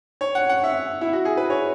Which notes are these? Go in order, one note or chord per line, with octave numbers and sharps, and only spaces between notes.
C#5
F#5
F#5
E5
E4
F#4
G#4
B4
C#5